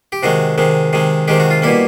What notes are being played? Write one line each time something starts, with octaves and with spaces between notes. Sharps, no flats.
G4
C3 D#3 G#3 F#4
C3 D#3 G#3
C3 D#3 G#3
C3 D#3 G#3 G4
F#4
F4
B2 G3 A#3 E4